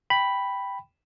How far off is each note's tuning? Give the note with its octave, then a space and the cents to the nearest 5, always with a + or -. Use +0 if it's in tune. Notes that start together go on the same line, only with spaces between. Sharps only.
G5 +0 B5 +0